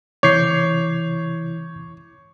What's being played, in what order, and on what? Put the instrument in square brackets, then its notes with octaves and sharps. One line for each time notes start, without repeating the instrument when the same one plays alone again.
[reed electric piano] C3 E3 E4 [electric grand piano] C#5 [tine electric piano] D6 G6 C7